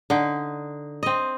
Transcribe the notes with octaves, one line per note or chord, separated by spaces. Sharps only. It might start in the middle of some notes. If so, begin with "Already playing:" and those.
D3 D#4
C4 D#5